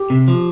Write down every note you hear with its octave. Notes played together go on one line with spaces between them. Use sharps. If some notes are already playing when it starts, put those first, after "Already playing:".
Already playing: G4
C3
F3